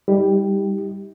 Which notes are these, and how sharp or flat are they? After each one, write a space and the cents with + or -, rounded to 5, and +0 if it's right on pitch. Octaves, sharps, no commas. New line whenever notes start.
G3 +15 D#4 +40 G4 +0